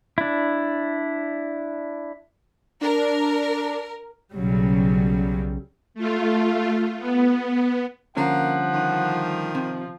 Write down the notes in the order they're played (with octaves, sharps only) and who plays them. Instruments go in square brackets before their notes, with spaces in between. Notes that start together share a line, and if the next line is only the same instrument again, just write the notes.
[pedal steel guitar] D4 E4
[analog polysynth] D4 [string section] A#4
[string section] B1 C#3 F#3 G3
[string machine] A3 F4
B3
[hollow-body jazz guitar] C2 D3 C#4 [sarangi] F3 [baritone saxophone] A#3 [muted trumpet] F#5
[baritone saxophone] D#3
[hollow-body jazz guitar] C3